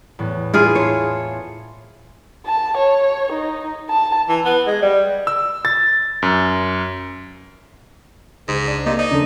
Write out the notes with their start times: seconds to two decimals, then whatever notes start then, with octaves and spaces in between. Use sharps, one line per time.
0.19 E2 A2 B3
0.54 E4 F4 G#4
0.75 C#5 A5 C6
2.46 A5
2.77 C#5
3.32 D#4
3.90 A5
4.29 E3
4.45 B3
4.67 G#3
4.82 G3
5.27 E6
5.65 A6
6.22 F#2
8.48 C#2 G#2 G#4
8.67 D4
8.86 C3 A#3 D#4
8.99 D#4 D5
9.11 D#2 C#3 F3 C#4 D4 A4